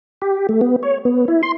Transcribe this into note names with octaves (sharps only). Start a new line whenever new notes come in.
G4
A3
B3
C#5
B3
E4
C6